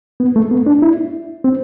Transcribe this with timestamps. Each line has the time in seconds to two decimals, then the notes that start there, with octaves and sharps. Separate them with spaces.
0.20 B3
0.36 A3
0.51 B3
0.66 D4
0.82 E4
1.44 C4